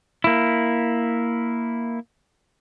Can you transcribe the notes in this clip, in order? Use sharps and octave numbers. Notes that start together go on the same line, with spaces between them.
A#3 E4